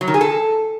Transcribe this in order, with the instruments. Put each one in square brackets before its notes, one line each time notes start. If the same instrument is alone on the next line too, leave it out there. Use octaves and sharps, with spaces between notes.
[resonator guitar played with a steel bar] F#3
D#3
G#4
A4